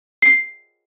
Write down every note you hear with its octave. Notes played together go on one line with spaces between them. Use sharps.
C7